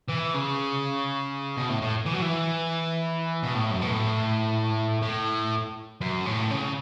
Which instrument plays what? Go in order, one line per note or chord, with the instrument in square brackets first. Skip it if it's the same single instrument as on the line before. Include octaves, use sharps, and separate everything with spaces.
[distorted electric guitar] E3
C#3
B2
A2
A2
E3
F#3
E3
B2
A2
F#2
B2
A2
A2
F#2
A2
C#3